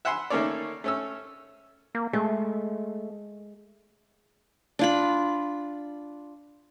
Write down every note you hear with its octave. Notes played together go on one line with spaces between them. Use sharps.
E5 F#5 G#5 B5 C6
D#3 A3 A#3 C#4 C#5 D5
A3 C#4 E6
A#3
G#3 A3
D4 F4 B5